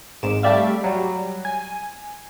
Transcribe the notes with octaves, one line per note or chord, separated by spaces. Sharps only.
G#1 G#2 D6 E7
G3 A3 G4 D5 E5 F5
F#3 G3
G#5